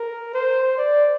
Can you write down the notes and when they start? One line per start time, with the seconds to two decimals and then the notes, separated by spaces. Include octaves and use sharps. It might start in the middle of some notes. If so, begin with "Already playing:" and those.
Already playing: A#4
0.34 C5
0.78 D5